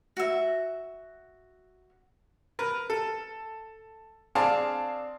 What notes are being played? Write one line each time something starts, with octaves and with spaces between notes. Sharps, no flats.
F#4 E5
A#4 B4
A4
C4 D4 G#4 F5 A5